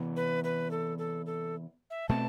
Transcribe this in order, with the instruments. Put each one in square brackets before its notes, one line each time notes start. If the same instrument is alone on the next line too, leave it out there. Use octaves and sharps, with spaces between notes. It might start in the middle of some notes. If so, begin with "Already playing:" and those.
Already playing: [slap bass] C3 E3 B3
[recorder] B4
B4
A4
A4
A4
E5
[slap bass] B2 A3 C4 [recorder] A5